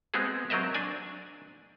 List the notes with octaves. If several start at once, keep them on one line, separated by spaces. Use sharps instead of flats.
G#3 B3 C4 F#4 G#4
F#3 C4 A#4 D#5 E5
D4 D5 G#5